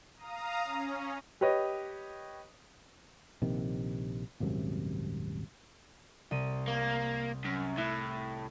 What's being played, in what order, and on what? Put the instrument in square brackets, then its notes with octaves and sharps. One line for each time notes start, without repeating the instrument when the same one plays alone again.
[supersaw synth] F5 A#5 D#6
C#4
[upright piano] G4 B4 C#5 D#5
[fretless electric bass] A#1 C3 D#3
D#1 G#1 F#2 C3
[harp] C2 D#7
[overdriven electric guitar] A#3
F#2
[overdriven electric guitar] A2 [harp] E4 F#6